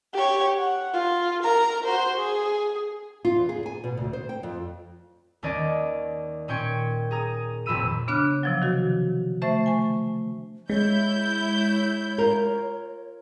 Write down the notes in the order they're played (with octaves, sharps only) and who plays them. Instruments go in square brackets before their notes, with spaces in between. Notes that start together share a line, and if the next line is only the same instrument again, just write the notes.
[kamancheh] G4 C#5
F#5
F4
A#4 A#5
F#4 C5
G#4
[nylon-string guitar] F4
E2
G#4
G#5
B2
D2
C5
G5
F2
[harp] D#2 D#3 C#4 D5 D#5
A#2 C#4 G5 C#6 G#6
G#4 A#5 D#6
D#1 F2 A#2 B5 E6 D#7
[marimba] C#3 B3 D4 F6 F#6
C3 F3 F#3
D#3 F#4
A3 C5 E5 C#6 A6
G#5 C#6
[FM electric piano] G#3 [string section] E4 G6 [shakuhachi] C#5
[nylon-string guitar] F4 A#4